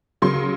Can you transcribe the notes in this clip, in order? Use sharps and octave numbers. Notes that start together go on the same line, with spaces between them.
C#3 F#3 C6